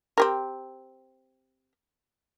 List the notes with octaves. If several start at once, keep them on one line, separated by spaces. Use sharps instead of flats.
C4 G4 A#4